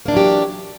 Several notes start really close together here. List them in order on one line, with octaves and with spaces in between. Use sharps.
A#3 D4 E3 F#3 G4